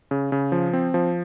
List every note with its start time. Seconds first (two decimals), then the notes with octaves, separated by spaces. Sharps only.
0.11 C#3
0.32 C#3
0.52 F3
0.73 C4
0.94 F3